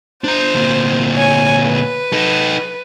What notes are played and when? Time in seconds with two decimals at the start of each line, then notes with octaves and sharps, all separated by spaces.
0.24 D4 C5 A#5
0.54 D2 A#2
1.16 C#5 G#5
1.64 B4
2.13 D#4 A4